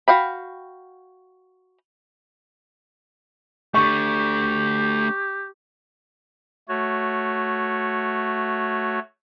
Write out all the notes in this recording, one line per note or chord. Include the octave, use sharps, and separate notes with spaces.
F#4 F5 G5 B5
A3 D4 G4 C#6
A3 F#4 C#5